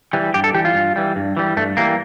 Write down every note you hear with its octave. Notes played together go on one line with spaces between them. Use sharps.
E3 G3
G2 G4
A4
E3 G3 G4
F4
G2
E3 G3
G2
E3 G3
G2 A3
E3 G3 A#3